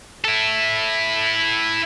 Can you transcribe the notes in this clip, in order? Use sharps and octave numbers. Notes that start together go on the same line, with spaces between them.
E4 A4